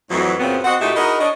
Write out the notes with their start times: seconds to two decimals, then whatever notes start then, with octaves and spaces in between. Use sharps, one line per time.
0.10 F2 A2 E3 F#3
0.40 F#2 A#2 C#3 B3 C4
0.65 C4 F#4 D#5 F#5
0.80 A#2 A3 D#4 E4 F#4 G4
0.96 D#4 E4 F#4 G#4 A#4 D#5
1.20 D4 C#5 D#5